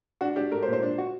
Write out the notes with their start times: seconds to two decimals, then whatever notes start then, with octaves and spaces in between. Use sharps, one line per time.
0.21 D4 F#4
0.36 D4 G4
0.51 A3 A#4
0.63 C5
0.67 A#2
0.73 C5
0.83 D4
0.98 F#4